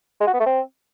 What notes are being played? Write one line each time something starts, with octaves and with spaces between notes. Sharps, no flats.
G#3
F#4
B3
A3
C4